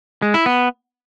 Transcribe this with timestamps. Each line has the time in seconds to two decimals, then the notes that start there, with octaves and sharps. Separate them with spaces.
0.22 G#3
0.34 E4
0.46 B3